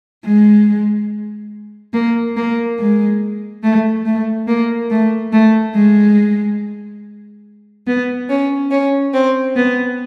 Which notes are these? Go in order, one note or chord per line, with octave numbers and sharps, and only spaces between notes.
G#3
A#3
A#3
G#3
A3
A3
A#3
A3
A3
G#3
B3
C#4
C#4
C4
B3